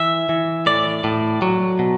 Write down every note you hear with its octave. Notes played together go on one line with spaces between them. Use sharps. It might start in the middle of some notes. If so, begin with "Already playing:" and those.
Already playing: E3 E5
E3
A2 D5
A2
F#3
B2